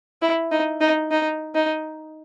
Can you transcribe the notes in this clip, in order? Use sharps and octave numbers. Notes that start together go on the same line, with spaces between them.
E4
D#4
D#4
D#4
D#4